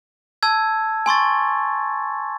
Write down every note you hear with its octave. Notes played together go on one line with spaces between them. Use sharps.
A5 E6 G#6
G#5 C6 C#6 A6